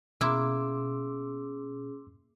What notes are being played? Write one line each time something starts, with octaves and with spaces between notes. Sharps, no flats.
B2 A#3 C#4 E4 G#4 C6 D6 E6